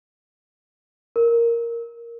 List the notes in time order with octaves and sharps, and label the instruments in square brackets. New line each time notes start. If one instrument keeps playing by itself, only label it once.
[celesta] A#4